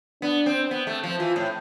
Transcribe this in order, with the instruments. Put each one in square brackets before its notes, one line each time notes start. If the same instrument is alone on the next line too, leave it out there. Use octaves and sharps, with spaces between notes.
[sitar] B3 [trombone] D4
[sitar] C4
B3
A3
F3
[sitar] E3 [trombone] F4
[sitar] A2